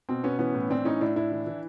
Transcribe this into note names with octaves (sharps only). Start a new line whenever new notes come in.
B2 C4
B2 B3 C#4
E3 B3 C#4
A2
E3 C4 D4
A2 C#4 D#4
A2 D4 E4
A2 D4 E4
E3
E3